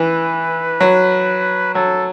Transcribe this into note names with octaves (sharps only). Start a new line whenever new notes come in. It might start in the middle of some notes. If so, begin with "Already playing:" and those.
Already playing: E3 B4
F#3
F#3 A4